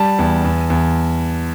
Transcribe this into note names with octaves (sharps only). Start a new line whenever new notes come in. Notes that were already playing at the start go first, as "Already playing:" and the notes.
Already playing: G3 A5
E2
E2
E2